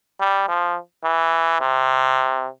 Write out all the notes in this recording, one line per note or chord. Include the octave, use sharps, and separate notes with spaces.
G3
F3
E3
C3